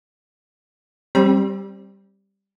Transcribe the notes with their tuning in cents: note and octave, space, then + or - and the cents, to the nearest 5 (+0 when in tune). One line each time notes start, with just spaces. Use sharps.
G3 +0 C4 +30 B5 -40